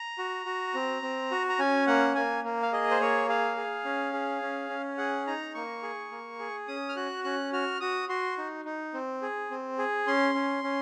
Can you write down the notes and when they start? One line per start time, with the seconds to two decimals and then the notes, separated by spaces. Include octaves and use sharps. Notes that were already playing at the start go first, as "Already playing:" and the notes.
Already playing: A#5
0.18 F#4
0.46 F#4
0.74 C4
1.02 C4
1.31 F#4
1.49 A#5
1.59 C#4 G#5
1.87 A#3 F#5
2.15 A#3 G#5
2.44 A#3
2.62 F5
2.72 G#4 D#5
2.91 C5
3.00 A#3 C#5
3.28 G#4 F5
3.57 G#4
3.85 C#4
4.13 G#4
4.42 C#4
4.69 C#4
4.98 G#4 F#5
5.27 D#4 A#5
5.54 A#3 C#6
5.83 G#4
6.12 A#3
6.40 G#4
6.68 C#4 D#6
6.89 F6
6.96 F#4 F#6
7.24 C#4 F#6
7.53 F#4 F6
7.80 F#4 D#6
8.09 F#4 C6
8.38 D#4
8.65 D#4
8.94 C4
9.22 G#4
9.51 C4
9.78 G#4
10.07 C#4 C6
10.34 C#4
10.64 C#4